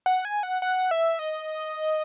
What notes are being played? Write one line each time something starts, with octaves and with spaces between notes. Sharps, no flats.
F#5
G#5
F#5
F#5
E5
D#5